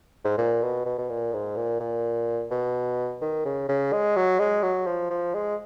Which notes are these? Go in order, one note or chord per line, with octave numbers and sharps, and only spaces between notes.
G#2
A#2
B2
B2
B2
A#2
G#2
A#2
A#2
B2
D#3
C#3
C#3
G#3
F#3
G#3
F#3
F3
F3
G#3